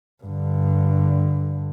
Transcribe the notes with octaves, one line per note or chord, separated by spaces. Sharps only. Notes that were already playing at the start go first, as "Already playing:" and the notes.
G2 D3